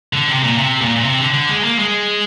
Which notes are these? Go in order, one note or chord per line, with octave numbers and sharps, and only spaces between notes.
D3
C3
A#2
C3
A#2
A#2
C3
D3
D3
G#3
A#3
G#3